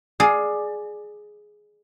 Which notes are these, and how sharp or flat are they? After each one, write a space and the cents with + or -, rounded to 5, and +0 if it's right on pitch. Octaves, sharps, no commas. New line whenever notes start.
G#4 +10 D5 +15 F5 +20